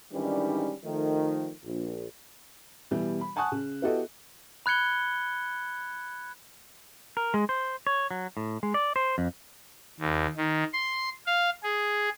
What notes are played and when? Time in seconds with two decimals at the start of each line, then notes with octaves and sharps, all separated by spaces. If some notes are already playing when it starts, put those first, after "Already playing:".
0.13 G#2 D#3 E3 G3 C#4 D4
0.85 D#3 F3 A3
1.65 A#1
2.91 B2 E3 G3
3.21 B5
3.36 F#5 G#5 A5 C#6 D#6 F#6
3.52 C#3
3.82 B3 E4 F#4 G4 A4 D#5
4.66 B5 F#6 G#6 C#7 G7
7.17 A#4
7.34 G#3
7.49 C5
7.87 C#5
8.11 F#3
8.37 A2
8.63 G#3
8.74 D5
8.96 C5
9.18 F2
10.00 D#2
10.37 D#3
10.73 C6
11.26 F5
11.63 G#4